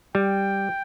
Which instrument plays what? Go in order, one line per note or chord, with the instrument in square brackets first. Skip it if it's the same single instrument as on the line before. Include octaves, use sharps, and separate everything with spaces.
[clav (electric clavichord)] G3 [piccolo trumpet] G5